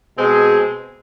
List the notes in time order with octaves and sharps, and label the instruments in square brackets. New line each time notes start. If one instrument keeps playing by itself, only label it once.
[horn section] B2 G#3 C4 G#4